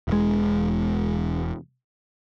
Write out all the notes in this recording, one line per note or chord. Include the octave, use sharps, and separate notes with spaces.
E1 G#3